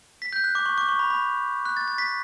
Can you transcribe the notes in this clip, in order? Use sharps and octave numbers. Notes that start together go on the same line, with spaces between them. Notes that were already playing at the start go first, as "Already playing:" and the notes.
B6
G6
F#6
D6
C#6
D6
C#6
B5
B5
F#6
A6
A6
B6